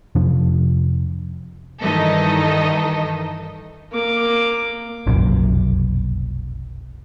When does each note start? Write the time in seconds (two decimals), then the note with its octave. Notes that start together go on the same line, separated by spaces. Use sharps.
0.15 F2 C3 F3 D4
1.82 G2 D#3 E3 D#4 A4 D#5
3.92 A#3 D6
5.07 F1 B1 F#2 A#2